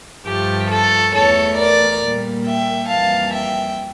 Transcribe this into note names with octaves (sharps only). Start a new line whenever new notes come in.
G2 F3 A3 G4
A4
E2 E3 A3 A4 C#5
A#4 D5
A#2 G3 A#3
E5 G5
F2 E3 G3 A#3 F5 A5
E5 G5